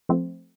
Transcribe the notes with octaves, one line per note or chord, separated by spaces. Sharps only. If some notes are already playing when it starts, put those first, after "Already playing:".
F3 A3 C4